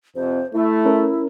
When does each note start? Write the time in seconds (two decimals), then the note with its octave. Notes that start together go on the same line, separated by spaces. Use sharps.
0.15 F2 C3 C5
0.53 A3 E4
0.85 C#4 A#4